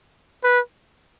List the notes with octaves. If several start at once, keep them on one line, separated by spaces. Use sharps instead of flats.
B4